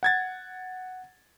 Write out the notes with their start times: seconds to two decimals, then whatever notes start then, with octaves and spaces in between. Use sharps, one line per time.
0.03 F#5 G#6 A6